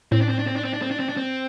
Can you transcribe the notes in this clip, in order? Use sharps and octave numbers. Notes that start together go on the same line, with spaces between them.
A2 C4
D4
C4
D4
C4
D4
C4
D4
C4
D4
C4
D4
C4